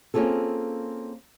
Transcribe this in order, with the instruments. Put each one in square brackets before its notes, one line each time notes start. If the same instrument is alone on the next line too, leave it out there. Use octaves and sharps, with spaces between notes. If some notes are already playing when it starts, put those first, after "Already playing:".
[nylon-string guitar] A#3 C4 C#4 F4 G#4 A4